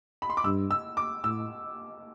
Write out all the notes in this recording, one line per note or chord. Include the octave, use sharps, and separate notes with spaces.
B5
C6
D6
G2 E6
E6
D6
A2 E6